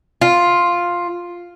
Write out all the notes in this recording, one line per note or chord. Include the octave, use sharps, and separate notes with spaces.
F4